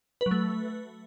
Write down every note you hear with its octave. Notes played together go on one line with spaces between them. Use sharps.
B4
F#3
A3